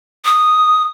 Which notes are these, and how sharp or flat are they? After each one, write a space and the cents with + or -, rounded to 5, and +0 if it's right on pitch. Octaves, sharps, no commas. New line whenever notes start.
D#6 -5